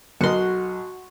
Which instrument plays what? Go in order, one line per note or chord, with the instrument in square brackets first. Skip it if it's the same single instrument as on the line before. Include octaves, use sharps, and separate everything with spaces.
[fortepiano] B1 A#4 D#5 [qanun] F#4 C6